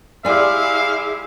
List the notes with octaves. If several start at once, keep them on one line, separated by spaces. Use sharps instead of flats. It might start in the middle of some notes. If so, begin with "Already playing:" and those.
G#3 E4 G4 G#4 D5 F5 G#5